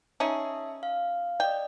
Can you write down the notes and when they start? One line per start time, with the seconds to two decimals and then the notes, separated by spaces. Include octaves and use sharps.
0.20 C#4 D#4 G#4 E5 A5
0.83 F5
1.40 D5 D#5 G5